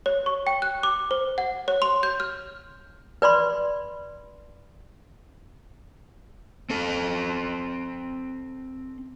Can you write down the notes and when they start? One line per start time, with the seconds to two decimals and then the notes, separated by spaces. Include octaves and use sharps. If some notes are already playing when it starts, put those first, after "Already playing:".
0.06 C#5
0.26 C#6
0.47 G5
0.62 F#6
0.83 D6
1.11 C5
1.38 F#5
1.68 C#5
1.82 C6
2.03 G6
2.20 F6
3.22 B4 D5 B5 C6
6.70 C4 A4